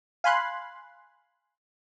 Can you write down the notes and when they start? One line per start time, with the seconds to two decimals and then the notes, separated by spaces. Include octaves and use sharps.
0.24 F5 G#5 B5 C6 F#6